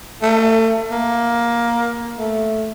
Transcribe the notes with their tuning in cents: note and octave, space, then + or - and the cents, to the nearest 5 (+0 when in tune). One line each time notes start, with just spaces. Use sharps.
A3 +35
A#3 +15
A3 -5